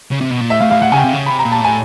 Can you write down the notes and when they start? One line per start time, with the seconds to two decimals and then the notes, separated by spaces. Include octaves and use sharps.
0.11 C#3
0.21 C3
0.31 B2
0.41 A#2
0.50 A2 E5
0.61 A2 F5
0.71 A2 F5
0.82 A2 F#5
0.92 C#3 G#5
0.98 G5
1.04 C3
1.13 C#3
1.26 C3 B5
1.39 A#5
1.45 A#2
1.52 A5
1.61 A2 G#5